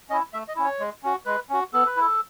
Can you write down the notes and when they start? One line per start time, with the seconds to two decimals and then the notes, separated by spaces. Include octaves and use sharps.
0.09 C#4 E4 D#5
0.33 A3 E5
0.48 D#5
0.56 C#4 E4
0.64 C#5
0.80 G#3
1.03 C#4 F#4
1.26 G#3 B4
1.50 C#4 F#4
1.73 B3 A4
1.86 B4
1.97 E4 A4